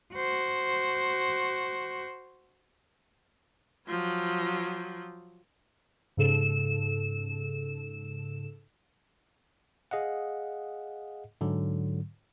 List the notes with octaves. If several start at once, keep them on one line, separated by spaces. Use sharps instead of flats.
F#4 C5
F3 F#3
G#2 C#3 A4 E7
G#4 D#5 F5 F#5
G#2 D3 F#3